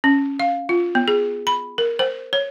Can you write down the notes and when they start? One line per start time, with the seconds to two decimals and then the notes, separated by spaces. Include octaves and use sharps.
0.04 C#4
0.40 F5
0.69 F4
0.95 B3
1.08 G#4
1.47 B5
1.78 A#4
1.99 C5
2.33 C#5